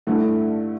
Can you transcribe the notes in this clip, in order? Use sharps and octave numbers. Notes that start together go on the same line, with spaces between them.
G2 D3 A3 E4